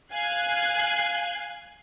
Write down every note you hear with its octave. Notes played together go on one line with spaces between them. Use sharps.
F5 G#5 F#6 G#6 C7